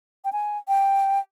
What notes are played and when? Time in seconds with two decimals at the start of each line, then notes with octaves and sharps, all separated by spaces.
0.25 G5
0.33 G#5
0.68 G5